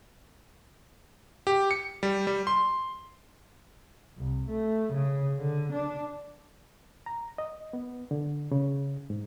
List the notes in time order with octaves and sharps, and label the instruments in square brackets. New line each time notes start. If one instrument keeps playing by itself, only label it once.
[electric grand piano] G4
C#7
G3
G3
C6
[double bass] C2
A3
C#3
D3
D4
[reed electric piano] A#5
D#5
B3
D3
C#3
G#2